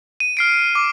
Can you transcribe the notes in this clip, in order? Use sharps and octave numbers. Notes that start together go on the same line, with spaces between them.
D#7
F6 C7 D7
D6